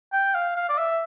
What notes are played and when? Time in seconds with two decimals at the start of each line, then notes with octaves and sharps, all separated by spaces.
0.13 G5
0.35 F5
0.56 F5
0.69 D5
0.78 E5